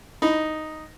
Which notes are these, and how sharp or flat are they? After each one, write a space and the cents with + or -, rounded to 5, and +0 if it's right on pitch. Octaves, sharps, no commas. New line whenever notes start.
D#4 +0 B5 +0